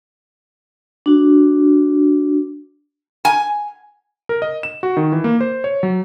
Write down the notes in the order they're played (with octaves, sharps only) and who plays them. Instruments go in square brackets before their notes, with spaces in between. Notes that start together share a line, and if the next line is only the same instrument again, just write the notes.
[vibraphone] D4 F#4
[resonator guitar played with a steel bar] G#5
[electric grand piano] A#4
D#5
E7
F#4
D#3
E3
A#3
C5
C#5
F#3